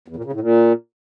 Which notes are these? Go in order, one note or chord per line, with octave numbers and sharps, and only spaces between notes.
E2
A#2
C#3
A2
A#2